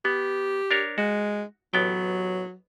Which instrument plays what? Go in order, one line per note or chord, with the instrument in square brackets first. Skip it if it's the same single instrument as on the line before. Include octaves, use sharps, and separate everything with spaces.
[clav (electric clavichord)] B3 [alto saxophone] G4
[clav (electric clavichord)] D4 A#4 C#5
[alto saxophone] G#3 [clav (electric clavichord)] F#4
[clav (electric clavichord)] A1 B3 G5 [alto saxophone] F#3